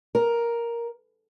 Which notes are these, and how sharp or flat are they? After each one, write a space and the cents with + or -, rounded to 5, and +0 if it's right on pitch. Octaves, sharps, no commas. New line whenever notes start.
A#4 +5